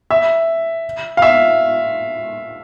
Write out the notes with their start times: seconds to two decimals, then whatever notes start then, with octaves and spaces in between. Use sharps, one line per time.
0.11 E5
1.17 F5
1.22 E5